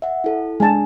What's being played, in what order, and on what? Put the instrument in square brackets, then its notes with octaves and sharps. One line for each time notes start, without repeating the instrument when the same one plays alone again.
[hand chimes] E5 F#5
E4 A4
[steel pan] G#3 A5 [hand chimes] D4 G#5